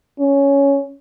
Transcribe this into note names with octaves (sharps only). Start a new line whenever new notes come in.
C#4